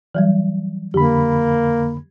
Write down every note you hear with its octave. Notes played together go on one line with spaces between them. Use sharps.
E3 F#3 G3
F2 D3 A#3 G4 B5